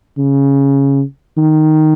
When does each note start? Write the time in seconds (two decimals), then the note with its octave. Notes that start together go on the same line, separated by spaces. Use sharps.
0.18 C#3
1.38 D#3